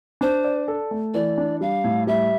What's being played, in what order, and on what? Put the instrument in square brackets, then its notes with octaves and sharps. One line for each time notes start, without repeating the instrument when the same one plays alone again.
[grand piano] D4 [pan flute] C5
[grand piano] D5
A4
A3
[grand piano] E3 [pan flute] D5
[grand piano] D4
[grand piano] G3 [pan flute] F5
[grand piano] A2
[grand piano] G3 [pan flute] E5